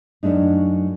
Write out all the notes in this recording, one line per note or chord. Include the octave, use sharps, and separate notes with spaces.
F#2 F#3 A3 D4 D#4